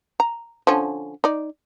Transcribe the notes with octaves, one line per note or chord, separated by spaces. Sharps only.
A#5
D3 F3 C#4
D#4 D5